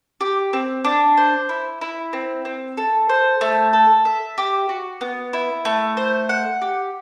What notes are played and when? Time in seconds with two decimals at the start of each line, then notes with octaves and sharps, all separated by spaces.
0.21 G4
0.53 C4
0.85 D4
1.17 C5
1.49 E4
1.81 E4
2.13 C4
2.45 C4
2.77 A4
3.09 C5
3.41 A3
3.73 A4
4.05 E5
4.38 G4
4.69 F#4
5.01 B3
5.33 E4
5.65 A3
5.97 C5
6.29 F#5
6.62 G4